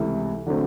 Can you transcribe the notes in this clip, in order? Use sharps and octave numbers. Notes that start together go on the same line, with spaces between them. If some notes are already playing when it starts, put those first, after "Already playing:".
Already playing: C#2 C3 E3 A3
D3 F#3 A3 C4